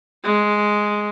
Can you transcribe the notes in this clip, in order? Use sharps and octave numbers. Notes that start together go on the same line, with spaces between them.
G#3